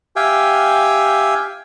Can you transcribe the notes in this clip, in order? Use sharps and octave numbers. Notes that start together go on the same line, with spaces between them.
G4 E5 F5 G5 G#5